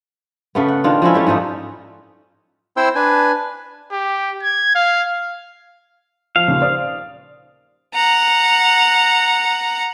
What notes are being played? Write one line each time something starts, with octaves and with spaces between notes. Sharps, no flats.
C#3 A3 B3
F#5
D#3 D4 F4
F3 G#3 C#4 E4
G3 A3 C#4
G#2 F3 A3 D#4
C4 E4 C5 G5 C6 E6
D4 B4 G#5
G4
G#6
F5
F3 F5
D#2 A#2 C#3
C5 D5 D#6
F#5 A#5